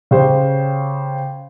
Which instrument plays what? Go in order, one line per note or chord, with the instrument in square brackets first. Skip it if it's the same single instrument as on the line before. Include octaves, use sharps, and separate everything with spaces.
[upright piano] C#3 G4 C5